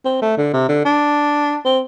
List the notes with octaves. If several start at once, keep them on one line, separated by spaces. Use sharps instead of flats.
C4
A3
D3
C3
D3
D4
C4